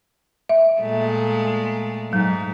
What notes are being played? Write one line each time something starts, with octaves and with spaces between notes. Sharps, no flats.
E5
A#2 G#3 A3
G#2 F#3